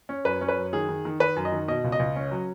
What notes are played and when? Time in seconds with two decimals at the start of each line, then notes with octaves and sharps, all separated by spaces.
0.09 C#4
0.25 F#2 B4
0.41 C#4
0.48 B4
0.57 F#2
0.73 D#3 G#4
0.89 D#3
1.05 D#3
1.20 D#3 B4
1.36 F#2
1.45 D#5
1.52 D#3
1.68 B2 D#5
1.84 C#2
1.92 D#5
1.99 C#2
2.16 C#4
2.31 F#3